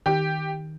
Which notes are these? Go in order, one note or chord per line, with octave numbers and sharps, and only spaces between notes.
D#3 G4